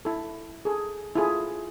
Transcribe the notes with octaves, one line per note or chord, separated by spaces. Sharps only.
E4 A4
G#4 A4
E4 F4 G#4 A4